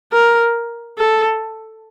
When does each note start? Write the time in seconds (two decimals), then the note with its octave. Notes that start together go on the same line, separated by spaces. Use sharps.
0.12 A#4
0.98 A4